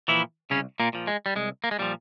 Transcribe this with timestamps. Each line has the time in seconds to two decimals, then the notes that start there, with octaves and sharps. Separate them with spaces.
0.08 A#2 E3 F3 E4
0.50 C2 C#3 C#4
0.80 A#2 A#3
0.93 A#2 F3
1.07 G#3
1.26 G3
1.35 C2 G#3
1.64 A#3
1.71 G#3
1.79 A#2 F3 G3